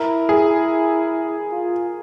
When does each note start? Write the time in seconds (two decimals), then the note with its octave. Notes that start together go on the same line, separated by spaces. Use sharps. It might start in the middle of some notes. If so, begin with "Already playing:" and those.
Already playing: E4 A#4
0.29 G#4
1.52 F4